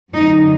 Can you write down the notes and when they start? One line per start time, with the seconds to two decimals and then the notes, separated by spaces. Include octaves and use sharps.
0.12 F#2 D3 D#4